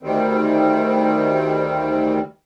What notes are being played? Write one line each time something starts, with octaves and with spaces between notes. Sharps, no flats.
D2 D#3 G3 C4